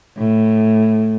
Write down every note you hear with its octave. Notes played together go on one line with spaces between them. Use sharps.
A2